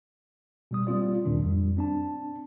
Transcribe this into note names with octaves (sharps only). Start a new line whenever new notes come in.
B2 G3 D#6
G3 A#3 C4 F4 D5
D2 A#2 D#3 D4
F2 G3
C4 D4 A5